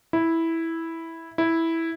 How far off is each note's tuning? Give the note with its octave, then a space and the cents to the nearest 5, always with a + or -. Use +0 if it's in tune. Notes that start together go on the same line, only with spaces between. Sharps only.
E4 -5
E4 -5